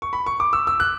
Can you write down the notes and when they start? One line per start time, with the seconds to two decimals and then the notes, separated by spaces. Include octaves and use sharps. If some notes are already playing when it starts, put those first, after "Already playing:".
0.02 C#6
0.13 B5
0.26 C#6
0.40 D6
0.53 E6
0.67 E6
0.80 F#6